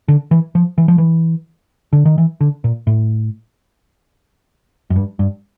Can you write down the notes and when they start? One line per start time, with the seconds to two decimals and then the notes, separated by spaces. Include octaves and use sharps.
0.08 D3
0.31 E3
0.55 F3
0.78 E3
0.88 F3
0.98 E3
1.93 D3
2.05 D#3
2.18 E3
2.41 D3
2.64 A#2
2.87 A2
4.90 F#2
4.96 G2
5.19 G2